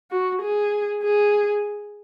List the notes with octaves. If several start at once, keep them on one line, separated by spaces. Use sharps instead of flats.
F#4
G#4
G#4